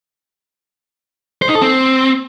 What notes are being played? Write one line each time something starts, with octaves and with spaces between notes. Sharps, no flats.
C5
D#4
A4
C4